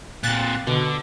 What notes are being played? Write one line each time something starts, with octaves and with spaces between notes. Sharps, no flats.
A#2 C4 F#6 A6
B2 D3